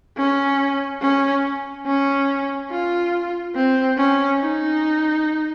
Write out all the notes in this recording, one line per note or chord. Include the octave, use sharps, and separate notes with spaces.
C#4
C#4
C#4
F4
C4
C#4
D#4